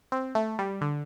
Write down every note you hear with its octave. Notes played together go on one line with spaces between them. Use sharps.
C4
A3
G3
D3